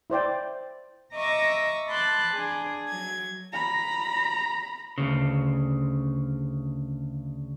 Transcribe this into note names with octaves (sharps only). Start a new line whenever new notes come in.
E4 C5 D5 G5
D#5 E5 A#5 C#6 D6 E6
A5 B5 C6 D6 F#6
D4 G#4
F#3 G#6
A#5 B5
D2 C#3